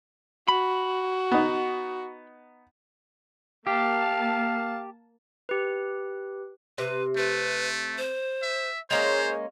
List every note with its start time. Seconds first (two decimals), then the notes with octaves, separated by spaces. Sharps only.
0.48 F#4 B5
1.32 B3 D#4
3.67 A#3 G4 F5 A5
5.49 G4 B4
6.78 C3 B4
7.17 A3 B4
7.98 C5
8.42 E5
8.91 G#3 A#3 C#4 C5 C#5